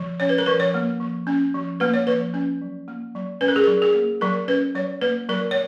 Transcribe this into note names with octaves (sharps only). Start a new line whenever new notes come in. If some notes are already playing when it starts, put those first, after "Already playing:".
Already playing: F3
C#4 C#5
B4
A#4
F3 B4
C#5
A#3
F3
C#4
F3
A#3 B4
C#5
F3 B4
C#4
F#3
A#3
F#3
C#4 B4
A#4
G#4
F#3 A#4
G#4
A#3
F#3 A#4
C#4 B4
F#3 C#5
A#3 B4
F#3 A#4
C#5